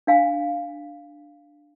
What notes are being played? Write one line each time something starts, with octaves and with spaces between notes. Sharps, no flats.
D4 F5 G#5